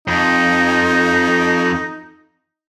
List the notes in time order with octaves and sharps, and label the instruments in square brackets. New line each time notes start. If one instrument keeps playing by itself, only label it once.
[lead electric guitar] F2 [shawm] D#4